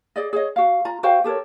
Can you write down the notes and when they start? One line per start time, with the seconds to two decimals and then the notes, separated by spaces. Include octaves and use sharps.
0.16 G#4 D5 D#5
0.33 G#4 C#5 D#5
0.56 F#4 F5
0.85 F4 A#5
1.03 F#4 C5 F5 G5
1.24 G4 A4 A#4 C#5